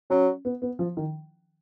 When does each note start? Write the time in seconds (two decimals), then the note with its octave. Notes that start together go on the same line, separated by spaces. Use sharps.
0.10 F#3 C#4
0.45 B3
0.62 B3
0.79 F3
0.97 D#3